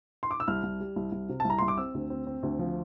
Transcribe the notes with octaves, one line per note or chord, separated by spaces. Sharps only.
C6
D6
E6
C2 F6
C2
G3
C2
C2
C3
A5
C2 A#5
C2 C6
D6
C4 E6
D2
C4
C4
D2
F3